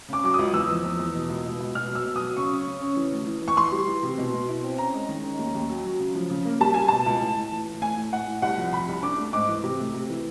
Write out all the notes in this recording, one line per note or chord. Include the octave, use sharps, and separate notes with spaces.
C#3 D6
F#3 D6
C#2 D#6
E2 E6
F3
E2
E2
B2
C#2
B2
C#2
B2 F6
F#3
E6
B2
F#3 D#6
C#3 C#6
C#4
C#3
C#4
E3
D2
E3
E3
C#6
E3 C6
G3
E3
C3
B2
B2
E4
C4
C#4 A#5
G#3
D#3
C#4
D#2
D#2
F#3
F#3
C#3
F3
C#3
A#3
G3 A5
G3 G#5
B2 A5
C#2
A2
A2
E3
A2
A3 G#5
A2
A2 F#5
A2
C2 F#5
F3
C3 B5
C2
D4 D6
A3
G#2 D6
E3
C3
A3
C3
E3